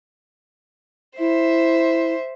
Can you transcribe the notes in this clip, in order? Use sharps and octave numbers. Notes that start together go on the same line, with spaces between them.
E4 C5 E5